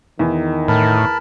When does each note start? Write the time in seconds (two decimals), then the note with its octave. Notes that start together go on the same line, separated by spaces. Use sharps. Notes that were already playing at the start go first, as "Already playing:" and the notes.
0.19 E2 D#3
0.68 A2 A#4 A5 B5